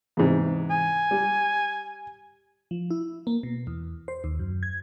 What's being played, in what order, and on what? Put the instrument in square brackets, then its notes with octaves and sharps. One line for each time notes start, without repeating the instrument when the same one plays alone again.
[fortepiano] E2 G#2 C3
[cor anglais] G#5
[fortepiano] G3
[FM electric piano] F3
E4
A#3
B2
E2
C5
D#2
F#2
G#6